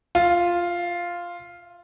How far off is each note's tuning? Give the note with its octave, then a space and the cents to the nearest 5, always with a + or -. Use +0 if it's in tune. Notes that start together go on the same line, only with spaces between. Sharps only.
F4 +0 E5 +35